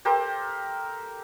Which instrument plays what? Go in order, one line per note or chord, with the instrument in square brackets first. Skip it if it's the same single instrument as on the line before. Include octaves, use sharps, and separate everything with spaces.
[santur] G4 A4 A#4 C5